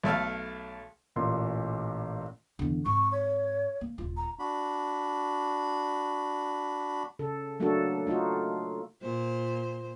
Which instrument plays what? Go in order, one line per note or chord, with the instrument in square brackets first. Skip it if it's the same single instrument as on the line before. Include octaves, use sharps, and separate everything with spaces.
[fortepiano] B1 A3 A4 F5
[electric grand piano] A1 A#2 C6
[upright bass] E2 D3
[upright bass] G#2 C4 [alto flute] C#6
[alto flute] C#5
[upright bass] A#3
D#1 F4
[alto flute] A#5
[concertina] D4 F#4 B5
[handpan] C#3 A4
F#3 A3 A#3 D4 F#4 A4
A3 D#4 F4 F#4
[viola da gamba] A#2 C5